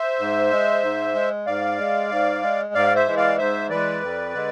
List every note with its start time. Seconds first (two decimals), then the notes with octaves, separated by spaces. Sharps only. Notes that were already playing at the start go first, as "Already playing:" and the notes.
Already playing: C5 E5
0.19 G#2
0.51 G#3
0.83 G#2
1.14 G#3
1.46 G#2 D5 F5
1.78 G#3
2.11 G#2
2.42 G#3
2.74 G#2 D5 F5
2.95 C5 E5
3.06 E3 G#3
3.17 D5 F5
3.38 G#2 C5 E5
3.70 E3 G#3 B4 D5
4.02 F2
4.34 D3 G#3